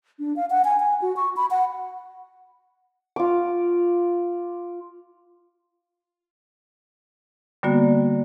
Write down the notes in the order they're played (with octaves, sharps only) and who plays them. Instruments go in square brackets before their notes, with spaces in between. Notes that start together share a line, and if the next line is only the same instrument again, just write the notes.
[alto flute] D4
F5
F#5
G#5
G#5
F#4
C#6
B5
F#5
[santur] F4 D6
[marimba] D3 G3 A#3 B3 F#4 D5